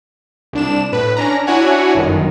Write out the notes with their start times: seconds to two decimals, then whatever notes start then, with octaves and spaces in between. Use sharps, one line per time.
0.53 C2 D4 E7
0.92 A2 B4
1.17 C#4 D4 A#5
1.47 D4 E4 F#4 C#5 F#5 G#5
1.95 G1 F#2 D#3